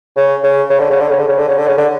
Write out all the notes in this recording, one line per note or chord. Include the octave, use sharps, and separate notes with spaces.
C#3
C#3
C#3
D3
C#3
D3
C#3
D3
C#3
D3
C#3
D3
C#3
D3